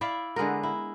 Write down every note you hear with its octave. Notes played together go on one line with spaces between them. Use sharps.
E4 D5 E5 F5
D3 G#3 B3 A#4
E4